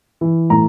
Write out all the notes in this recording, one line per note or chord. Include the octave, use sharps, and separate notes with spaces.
E3
A2 A#5